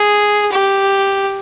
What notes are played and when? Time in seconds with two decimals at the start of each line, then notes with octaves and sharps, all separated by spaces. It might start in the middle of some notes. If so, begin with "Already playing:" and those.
Already playing: G#4
0.52 G4